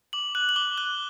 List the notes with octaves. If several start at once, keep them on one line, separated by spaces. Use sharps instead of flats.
D6 F#7
F#6 F#7
F#7
D6 G7
F#6 G7